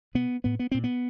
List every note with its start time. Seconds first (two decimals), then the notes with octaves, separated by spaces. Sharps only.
0.15 B2 B3
0.44 A2 B3
0.59 B3
0.72 A#2 C4
0.84 B3